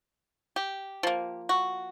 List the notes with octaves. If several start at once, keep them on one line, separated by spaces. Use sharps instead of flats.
G4
F3 A#3
F#4